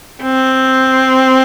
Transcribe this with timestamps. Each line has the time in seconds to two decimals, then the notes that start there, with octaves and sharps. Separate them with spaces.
0.23 C4